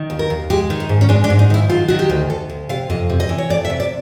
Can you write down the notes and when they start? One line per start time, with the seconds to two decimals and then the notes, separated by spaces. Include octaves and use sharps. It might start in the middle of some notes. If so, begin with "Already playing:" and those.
Already playing: D#3
0.10 D#2
0.19 A#4
0.30 D#2
0.50 G#3 G4
0.70 D#3
0.80 D#4
0.89 G#2
1.01 C#4
1.09 G#3 D4
1.24 D4
1.30 G#2
1.39 D#4
1.50 D#3 E4
1.70 F#3 F4
1.88 D#3 F#4
1.99 G4
2.10 D2
2.30 D2 A4
2.50 D2
2.69 C3 F5
2.90 F2 D#5
3.10 C3
3.20 D#5
3.29 E3
3.38 C#5
3.50 F2 D5
3.65 E5
3.70 C3
3.80 D5